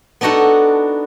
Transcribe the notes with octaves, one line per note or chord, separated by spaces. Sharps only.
B3 D4 D#4 F#4 A4